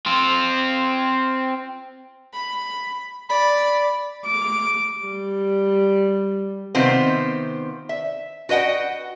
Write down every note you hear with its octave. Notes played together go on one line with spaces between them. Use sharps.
C4 F4
B5
D5 B5
D6
G3
C3 D#3 B3 C4 F4 C5
E5
F#4 B4 D#5 F#5 G5